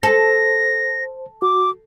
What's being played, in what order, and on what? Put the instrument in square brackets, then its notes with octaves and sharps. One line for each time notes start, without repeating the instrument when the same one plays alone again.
[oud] A4 [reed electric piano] C5 [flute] A#6
[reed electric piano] F#4 [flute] D6